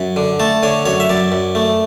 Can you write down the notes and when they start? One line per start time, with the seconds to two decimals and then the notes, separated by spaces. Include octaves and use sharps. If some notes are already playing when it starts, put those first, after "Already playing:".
Already playing: F#2
0.16 D3
0.40 A3 A4
0.63 D3 C#5
0.86 F#2 C#5
1.00 E5
1.09 F#2 D5
1.32 F#2
1.55 A3